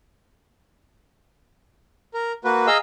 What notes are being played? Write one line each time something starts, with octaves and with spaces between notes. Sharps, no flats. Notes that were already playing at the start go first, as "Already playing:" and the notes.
A#4
A#3 F#4 B4
G#4 D#5 F5 A#5 E6